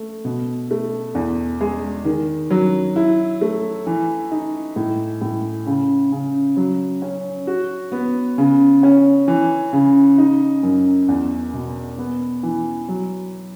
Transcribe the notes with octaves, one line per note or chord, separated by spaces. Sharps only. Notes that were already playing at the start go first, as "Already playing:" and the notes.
Already playing: A3
B2
A3
E2
G#3
D#3
F#3
E4
A3
E3
D#4
A2
A2
C#3
C#3
F#3
C#4
F#4
B3
C#3
C#4
E3
C#3
D#4
F#2
E2
B2
B3
E3
F#3